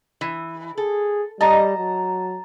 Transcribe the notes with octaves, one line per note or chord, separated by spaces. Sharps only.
E3
G#4 A4
G3 D#5 A5 A#5
F#3